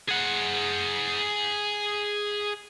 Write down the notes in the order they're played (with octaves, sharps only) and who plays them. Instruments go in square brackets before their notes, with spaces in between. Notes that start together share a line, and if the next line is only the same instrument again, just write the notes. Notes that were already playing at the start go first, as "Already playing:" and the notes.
[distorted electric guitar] G#4 F#5